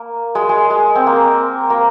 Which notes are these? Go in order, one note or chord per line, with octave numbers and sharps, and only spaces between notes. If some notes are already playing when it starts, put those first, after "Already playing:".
Already playing: A#3
G#3
G#3
G#3
C4
A#3
A#3